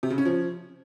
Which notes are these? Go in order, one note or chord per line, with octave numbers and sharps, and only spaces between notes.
C3
C#3
C#4
F3